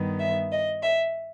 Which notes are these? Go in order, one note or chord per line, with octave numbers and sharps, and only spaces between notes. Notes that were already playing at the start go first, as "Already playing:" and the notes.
Already playing: G2 D#3 G3 B3
E5
D#5
E5